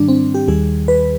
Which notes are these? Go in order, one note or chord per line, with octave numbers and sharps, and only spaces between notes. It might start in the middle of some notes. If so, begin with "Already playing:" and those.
Already playing: G#2 D#3 G3 D4
C4
G4
D#2 D#3 G3 G#4
B4